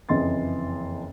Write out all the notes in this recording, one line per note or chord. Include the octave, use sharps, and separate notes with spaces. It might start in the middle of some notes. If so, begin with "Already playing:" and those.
F#1 F2 E3 D#5 C6 A6